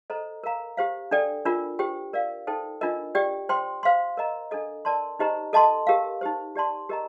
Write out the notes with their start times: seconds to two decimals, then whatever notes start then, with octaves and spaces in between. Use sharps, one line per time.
0.10 A4 C5 D#5 A#5
0.44 A#4 F5 A#5
0.77 G4 C5 F5
1.11 D4 A4 D5 G5
1.45 D4 F4 A#4
1.79 G4 C5 G5
2.13 A#4 D5 F5
2.47 D#4 A4 C5 G5
2.81 D4 F4 A#4 D#5
3.15 G4 D5 G5
3.49 C5 G5 C6
3.83 C5 F5 C6
4.17 A#4 D#5 A#5
4.51 D4 A4 D#5
4.85 A#4 D5 A5 C6
5.19 D#4 G4 C5 D#5 A#5
5.53 A4 D#5 A5 C6
5.87 G4 A#4 F5
6.21 D#4 G4 C5
6.55 G4 D5 A5 C6
6.89 G4 A#4 D#5 A#5